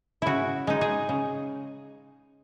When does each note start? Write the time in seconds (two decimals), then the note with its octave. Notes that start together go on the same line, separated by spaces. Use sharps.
0.22 C#3 E4 F#4
0.67 G#3 D#4
0.81 G#4
1.09 C#3